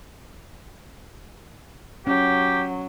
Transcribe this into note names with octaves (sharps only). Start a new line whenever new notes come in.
F#3 C#4 G4